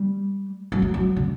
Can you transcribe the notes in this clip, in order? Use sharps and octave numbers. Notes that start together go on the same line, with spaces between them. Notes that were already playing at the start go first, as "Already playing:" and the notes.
Already playing: G3
F#3
F#3
F#3
D3